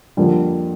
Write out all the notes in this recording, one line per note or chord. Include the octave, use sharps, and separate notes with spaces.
F2 D3 G3 A#3